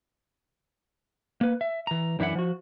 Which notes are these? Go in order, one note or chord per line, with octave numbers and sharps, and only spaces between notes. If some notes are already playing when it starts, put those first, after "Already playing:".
A#3 B4
E5
E3 A#5
F#2 E3 D4 E4 E5 F#5
F3 F#4